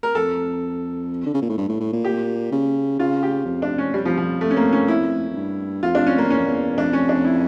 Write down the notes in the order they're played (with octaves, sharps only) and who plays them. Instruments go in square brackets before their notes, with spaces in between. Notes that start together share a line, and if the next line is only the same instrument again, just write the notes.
[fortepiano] A#4
[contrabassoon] F2 [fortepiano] A4
[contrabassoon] D3
C#3
A#2
A2
G2
A2
A2
A#2
[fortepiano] G4
[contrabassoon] C#3
[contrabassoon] C#3 [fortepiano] F4
[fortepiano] G4
[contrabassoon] F2
[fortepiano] D4
C#4
[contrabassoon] F2 [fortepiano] G3
[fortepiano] F3
F3
A3
C#4
A#3
C#4
E4
[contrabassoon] F2
G2
[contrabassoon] F2 [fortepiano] F4
[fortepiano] D4
C#4
A#3
[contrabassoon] E2 [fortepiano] C#4
[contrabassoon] F2
E2
[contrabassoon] F2 [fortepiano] D4
[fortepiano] C#4
D4
E4